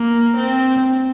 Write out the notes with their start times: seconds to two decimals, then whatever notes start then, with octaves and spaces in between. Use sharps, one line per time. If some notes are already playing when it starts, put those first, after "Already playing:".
Already playing: A#3
0.37 C4